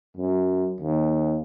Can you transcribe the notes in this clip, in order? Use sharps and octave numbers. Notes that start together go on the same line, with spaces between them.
F#2
D#2